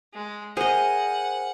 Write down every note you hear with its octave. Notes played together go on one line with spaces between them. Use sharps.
G#3
G#4 A#4 C5 D#5 F#5 G#5